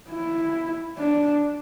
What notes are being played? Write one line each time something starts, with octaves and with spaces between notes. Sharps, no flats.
E4
D4